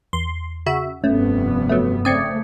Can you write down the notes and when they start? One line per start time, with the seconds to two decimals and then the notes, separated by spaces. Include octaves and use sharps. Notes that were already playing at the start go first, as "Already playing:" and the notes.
0.13 E2 C6
0.66 C#3 F#4 E5
1.04 F1 G2 A3 B3 C#4
1.69 F#3 A3
2.05 C#3 A3 C4 D5 D#6 G#6 C#7